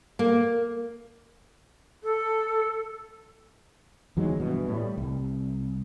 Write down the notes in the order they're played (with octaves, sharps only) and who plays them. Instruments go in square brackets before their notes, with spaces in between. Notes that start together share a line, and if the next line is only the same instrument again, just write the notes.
[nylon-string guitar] A#3
[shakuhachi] A4
[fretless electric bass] E2 D#3 F#3 G#3
G2 B2 E3
A2 G3
C2